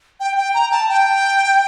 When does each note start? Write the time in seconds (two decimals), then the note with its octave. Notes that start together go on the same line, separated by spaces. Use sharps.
0.20 G5
0.37 G5
0.54 A#5
0.72 A5
0.89 G5